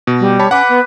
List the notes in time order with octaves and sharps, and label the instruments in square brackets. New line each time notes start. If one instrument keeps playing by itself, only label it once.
[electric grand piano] B2
[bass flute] G3
[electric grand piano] C#5 A5 B5
[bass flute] C#4 [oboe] B4 [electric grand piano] F#5 D6
[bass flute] B3